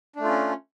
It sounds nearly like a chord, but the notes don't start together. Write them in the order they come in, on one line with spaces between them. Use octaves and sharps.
D4 A3 F4 C#4